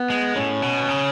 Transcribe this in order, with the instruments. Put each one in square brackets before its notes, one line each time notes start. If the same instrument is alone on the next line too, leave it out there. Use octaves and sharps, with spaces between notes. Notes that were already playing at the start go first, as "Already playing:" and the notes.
Already playing: [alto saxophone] B3
[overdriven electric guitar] G#3
[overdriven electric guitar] A2 [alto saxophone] C#4
[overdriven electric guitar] B2
C#3